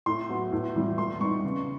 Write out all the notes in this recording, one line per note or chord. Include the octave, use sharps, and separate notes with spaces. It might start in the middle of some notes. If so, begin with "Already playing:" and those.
A2 C6
F#3 B3
A2
E3 G3
A#2 C6
G3 B3 D#4 C#6
C#3